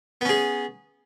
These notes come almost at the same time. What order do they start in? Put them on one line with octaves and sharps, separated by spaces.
B3 C#4 G#4